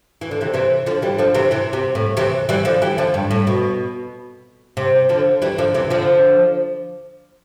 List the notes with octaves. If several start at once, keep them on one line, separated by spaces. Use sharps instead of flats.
E3
D3
C3 E3
C3 E3
D3 F3
E3 G3
D3 F3
C3 E3
C3 E3
C3
A2
C3 E3
E3 G3
D3 F3
E3 G3
D3 F3
G2
A2
B2
C3
D3 F3
E3 G3
D3 F3
C3 E3
D3 F3